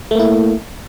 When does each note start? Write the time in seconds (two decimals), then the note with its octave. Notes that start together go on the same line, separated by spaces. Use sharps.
0.11 A3
0.15 A#3
0.19 E4